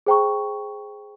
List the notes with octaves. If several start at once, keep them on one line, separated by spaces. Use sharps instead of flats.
G#4 C5 G5 A#5 C#6